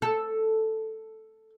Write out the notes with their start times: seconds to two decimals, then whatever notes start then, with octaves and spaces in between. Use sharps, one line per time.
0.02 A4